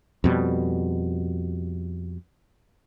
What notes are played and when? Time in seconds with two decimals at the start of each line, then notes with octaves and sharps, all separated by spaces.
0.24 F2 B2 G3